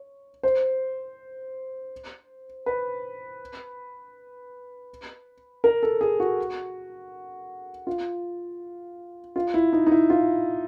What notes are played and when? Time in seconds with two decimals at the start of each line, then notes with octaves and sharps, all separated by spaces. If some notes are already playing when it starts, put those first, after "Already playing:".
Already playing: C#5
0.43 C5
2.66 B4
5.64 A#4
5.83 A4
6.01 G#4
6.20 F#4
7.87 F4
9.36 F4
9.54 E4
9.73 D#4
9.86 D#4
9.92 E4
10.10 F4